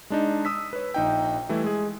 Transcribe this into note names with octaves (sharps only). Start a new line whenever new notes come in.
G#3 D4 D#4
D#6 E6 B6
B4 C#5
A#1 D#4 G5
E3 G3 A3 E4
G#3 G#4